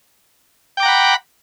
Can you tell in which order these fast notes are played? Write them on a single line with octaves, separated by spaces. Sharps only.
G5 D6 A#5 F#5 B5